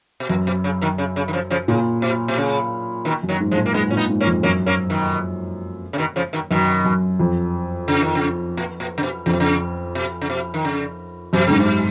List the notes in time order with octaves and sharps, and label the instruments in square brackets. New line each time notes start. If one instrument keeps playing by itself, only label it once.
[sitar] B2
[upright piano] F#2 [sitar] A#2
[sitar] B2
C#3
B2 D#3
C#3
C#3
D#3
C#3 F3
C#3 F3
[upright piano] A#2 [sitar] C#3
[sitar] B2
B2
C#3
B2 D#3
[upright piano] F#2
[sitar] D#3 F#3
[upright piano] G#2
[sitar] F3 G#3
[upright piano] A#2
[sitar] A#3
[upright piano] G#2 [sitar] G#3 B3
[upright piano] A#2 [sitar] C#4
[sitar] B3 D#4
[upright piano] G#2
[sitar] A#3 C#4
[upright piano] F2
[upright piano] F#2 [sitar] A#3 C#4
[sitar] A#3 C#4
B2 D#3
C#3
B2 D#3
C#3 F3
B2 D#3
[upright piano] F#2 [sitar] B2 D#3
[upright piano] F#2
F2
[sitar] C#3
D#3
C#3
A#2
A#2
C#3
B2
[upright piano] F2 [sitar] C#3
[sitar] B2
C#3
B2
C#3
B2
D#3
C#3
[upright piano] F#2 [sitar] B2
[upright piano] G#2 [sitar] C#3
[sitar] B2